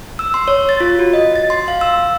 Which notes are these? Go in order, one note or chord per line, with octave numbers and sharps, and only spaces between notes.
E6
C6
C#5
A6
F4
F#4
D#5
A6
C6
F5
E6